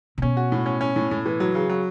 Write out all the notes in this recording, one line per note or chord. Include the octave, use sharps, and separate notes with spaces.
C#3
B2 C#4
F#4
A2
C#4
C#4
A2
A2
E3
F#3
C#3
F#3